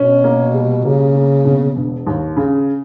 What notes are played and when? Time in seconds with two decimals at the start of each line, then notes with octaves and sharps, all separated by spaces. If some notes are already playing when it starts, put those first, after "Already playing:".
Already playing: B2 C#4
0.24 A#3
0.54 G3
0.84 C#3 A#3
1.15 A#3
1.45 B2
1.75 E1
2.07 D#2
2.37 C#3